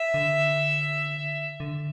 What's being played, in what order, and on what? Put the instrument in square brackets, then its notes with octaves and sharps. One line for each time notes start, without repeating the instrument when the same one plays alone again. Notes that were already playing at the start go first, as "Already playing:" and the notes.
Already playing: [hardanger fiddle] E5
[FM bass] D3
D3